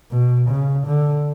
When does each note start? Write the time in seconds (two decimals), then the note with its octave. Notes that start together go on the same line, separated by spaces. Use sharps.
0.11 B2
0.49 C#3
0.86 D3